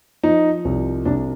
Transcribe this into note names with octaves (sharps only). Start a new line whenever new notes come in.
F3 D#4
C2
C2 D4